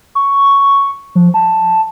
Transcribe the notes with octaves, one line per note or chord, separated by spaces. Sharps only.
C#6
F3
A5